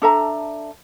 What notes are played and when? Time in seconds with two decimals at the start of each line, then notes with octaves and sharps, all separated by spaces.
0.02 D4 A4 E5 A#5